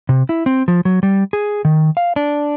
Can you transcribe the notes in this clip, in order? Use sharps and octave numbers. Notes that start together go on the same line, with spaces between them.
C3
E4
C4
F3
F#3
G3
G#4
D#3
F5
D4